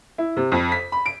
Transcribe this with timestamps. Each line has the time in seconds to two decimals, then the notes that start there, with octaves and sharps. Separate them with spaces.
0.18 E4
0.37 C3
0.52 F2
0.72 B6
0.92 B5
1.06 D7